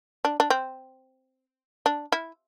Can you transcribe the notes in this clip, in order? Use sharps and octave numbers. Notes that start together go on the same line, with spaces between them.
D4
D4
C4
D4
E4